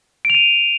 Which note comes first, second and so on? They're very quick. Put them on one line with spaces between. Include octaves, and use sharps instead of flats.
D7 F7 D#7